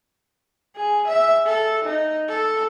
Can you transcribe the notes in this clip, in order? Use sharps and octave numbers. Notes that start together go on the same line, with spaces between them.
G#4
E5
A4
D#4
A4